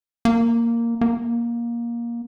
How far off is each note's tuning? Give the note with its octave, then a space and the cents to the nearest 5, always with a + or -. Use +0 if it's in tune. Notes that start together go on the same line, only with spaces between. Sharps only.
A#3 -5
A#3 +15